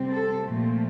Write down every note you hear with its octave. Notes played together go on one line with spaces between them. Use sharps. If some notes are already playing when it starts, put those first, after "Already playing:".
Already playing: C3 G3 C4
A4
A#2 F3 A3 C4